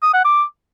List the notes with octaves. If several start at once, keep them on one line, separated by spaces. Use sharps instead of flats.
D#6
F#5
D6